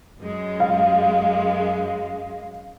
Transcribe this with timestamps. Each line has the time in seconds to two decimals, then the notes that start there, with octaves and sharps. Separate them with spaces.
0.20 F#2 G#3
0.60 F5